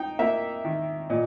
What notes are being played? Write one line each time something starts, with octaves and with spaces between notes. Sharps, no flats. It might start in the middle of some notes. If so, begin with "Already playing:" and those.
Already playing: D#4 G5
A#3 E5
D#3
A#2 D#5